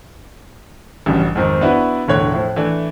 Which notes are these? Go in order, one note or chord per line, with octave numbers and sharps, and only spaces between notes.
A1 G2 C#3 F#3 G3
F2 G#2 D#3 F3
B3 D4 E4 F#4 B4
E1 A2 D3 C#5 F#6 G#6
A2 F3
E3 A3 D4